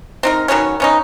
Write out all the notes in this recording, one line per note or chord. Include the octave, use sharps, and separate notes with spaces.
C4 D#4 A#4
D#3 F#3 B3 C#4
B3 C#4 D#4